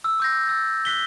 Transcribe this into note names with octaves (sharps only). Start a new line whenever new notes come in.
E6
D6 G6 A#6
E6 A6
F#6 B6 G7